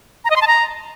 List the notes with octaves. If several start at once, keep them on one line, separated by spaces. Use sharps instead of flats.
A#5
D#5
C6
A5
A#5